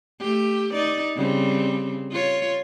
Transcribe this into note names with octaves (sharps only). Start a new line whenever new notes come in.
A3 G4
D#4 D5
C#3 G3 C4
F4 C#5